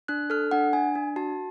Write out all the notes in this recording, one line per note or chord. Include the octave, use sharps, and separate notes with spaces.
D4 F#6
A4 F6
D4 F#5
D4 G#5
D4
F#4 A5